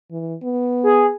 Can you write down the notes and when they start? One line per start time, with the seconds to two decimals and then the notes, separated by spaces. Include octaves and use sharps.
0.11 E3
0.43 B3
0.83 G#4